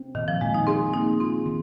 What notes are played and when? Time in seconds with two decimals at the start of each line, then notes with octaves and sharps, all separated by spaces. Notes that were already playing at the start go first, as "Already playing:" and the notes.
Already playing: C4
0.15 A#2 D#3
0.28 F3
0.41 A#2 G#3
0.54 D#4
0.67 C4 G#4
0.94 A#3 D#4
1.20 C4 F4
1.46 D#3